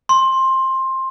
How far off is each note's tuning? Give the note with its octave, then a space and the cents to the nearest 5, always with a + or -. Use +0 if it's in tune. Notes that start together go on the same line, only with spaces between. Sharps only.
C6 +15